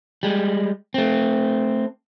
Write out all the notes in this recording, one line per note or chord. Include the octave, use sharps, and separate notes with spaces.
G3 G#3
A3 C4